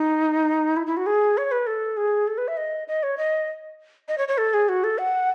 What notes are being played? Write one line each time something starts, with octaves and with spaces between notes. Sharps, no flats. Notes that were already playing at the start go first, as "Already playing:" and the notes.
Already playing: D#4
E4
E4
F#4
G#4
C#5
B4
A4
G#4
A4
B4
E5
D#5
D#5
C#5
D#5
D#5
C#5
C#5
A4
G#4
F#4
A4
F#5